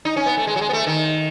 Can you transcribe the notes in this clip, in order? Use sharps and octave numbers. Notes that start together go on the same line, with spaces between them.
D#4
C#4
B3
A3
G#3
F#3
G#3
B3
A3
D#3